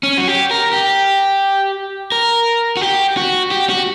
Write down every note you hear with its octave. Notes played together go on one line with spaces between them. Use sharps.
C#4
F#4
G4
A#4
G4
A#4
F#4
G4
F#4
G4
F#4